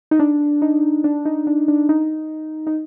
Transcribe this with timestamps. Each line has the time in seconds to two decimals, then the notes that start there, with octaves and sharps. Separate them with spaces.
0.11 D#4
0.19 D4
0.62 D#4
1.04 D4
1.25 D#4
1.47 D4
1.68 D4
1.89 D#4
2.67 D#4